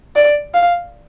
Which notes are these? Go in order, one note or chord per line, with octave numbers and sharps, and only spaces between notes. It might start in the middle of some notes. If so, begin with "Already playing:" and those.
D5
F5